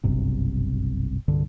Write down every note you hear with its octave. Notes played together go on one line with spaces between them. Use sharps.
F#1 B1 G2 C3
C2 G2 D3